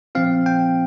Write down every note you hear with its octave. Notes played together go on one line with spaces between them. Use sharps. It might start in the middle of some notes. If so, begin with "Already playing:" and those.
A#2 F3 C4 F4 F5
G5